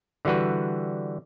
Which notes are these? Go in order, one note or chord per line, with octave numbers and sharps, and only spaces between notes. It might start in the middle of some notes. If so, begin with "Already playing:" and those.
D3 E3 G3 F#4 B4